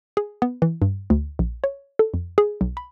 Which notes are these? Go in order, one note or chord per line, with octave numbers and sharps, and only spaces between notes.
G#4
B3
E3
G2
D2
A#1
C#5
A4
F2
G#4
B1
B5